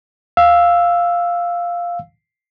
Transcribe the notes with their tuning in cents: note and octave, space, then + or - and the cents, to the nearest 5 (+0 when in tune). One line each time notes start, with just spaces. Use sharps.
F5 +0 E6 +0